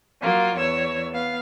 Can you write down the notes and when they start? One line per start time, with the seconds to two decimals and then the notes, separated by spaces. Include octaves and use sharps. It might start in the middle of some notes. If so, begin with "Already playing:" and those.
0.20 F#3 A#3 F4
0.57 E2 C#5 E6
1.12 B3 F5